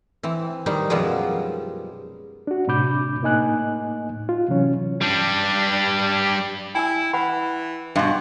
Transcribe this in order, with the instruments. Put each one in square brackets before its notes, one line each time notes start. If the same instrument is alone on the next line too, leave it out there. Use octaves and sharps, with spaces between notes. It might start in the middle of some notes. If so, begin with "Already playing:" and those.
[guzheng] E3 C4
D#3 G3 D#4 C5
F#2 B2 F3 G3 G#3
[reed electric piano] D4 F#4
A2 C3 D4 B5 D6 G6
A2 A#3 D#4 D#5 G#5 F#6
F4
C3 E3 F#3 C#4
[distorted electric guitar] G3 D4
[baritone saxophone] E4 [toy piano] G5 G#5 E6
[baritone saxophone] E3 [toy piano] B4 F#5 B5
[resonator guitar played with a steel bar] G2 B2 [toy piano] D#5 C6